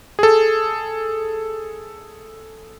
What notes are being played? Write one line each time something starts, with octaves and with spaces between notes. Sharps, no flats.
G#4 A4